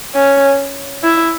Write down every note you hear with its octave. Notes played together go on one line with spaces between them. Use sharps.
C#4
E4